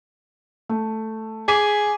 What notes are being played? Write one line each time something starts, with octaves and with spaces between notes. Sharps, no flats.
A3
G#4 D6 B6 D#7